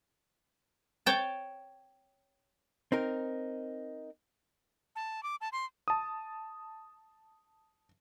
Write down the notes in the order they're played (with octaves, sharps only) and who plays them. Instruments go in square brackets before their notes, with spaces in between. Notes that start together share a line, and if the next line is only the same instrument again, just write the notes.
[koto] C#5 G5 A5
[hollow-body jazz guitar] C4 D#4 A#4
[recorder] A5
D6
A5
C6
[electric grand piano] A5 D#6